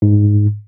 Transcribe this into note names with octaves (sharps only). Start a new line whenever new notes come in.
G#2